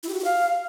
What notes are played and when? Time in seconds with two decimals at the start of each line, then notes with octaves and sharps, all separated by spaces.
0.03 E4
0.09 G4
0.14 F#4
0.19 G4
0.24 F5